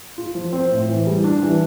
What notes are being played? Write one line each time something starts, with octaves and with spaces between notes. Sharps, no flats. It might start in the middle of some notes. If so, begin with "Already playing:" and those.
F4
F3
C4
A2
E3
G3
D4
E3